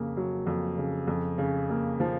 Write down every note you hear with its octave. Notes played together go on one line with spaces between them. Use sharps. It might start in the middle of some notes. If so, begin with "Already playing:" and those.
Already playing: F2 C#3 A#3
F#3
F2
C#3
F2
C#3
A#3
F3